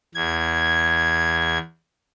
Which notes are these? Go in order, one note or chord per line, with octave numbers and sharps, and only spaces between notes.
E2 G#6